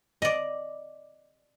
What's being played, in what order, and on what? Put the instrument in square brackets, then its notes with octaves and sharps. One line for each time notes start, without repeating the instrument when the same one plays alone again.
[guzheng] D5 D#5